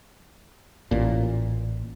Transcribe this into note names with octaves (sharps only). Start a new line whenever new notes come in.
A1 A#2